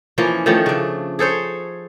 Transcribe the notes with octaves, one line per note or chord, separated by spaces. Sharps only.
E3 F3 A#3 C#4
D#3 F3 A3 C#4
C#3 D4
G#4 A4 C5 C#5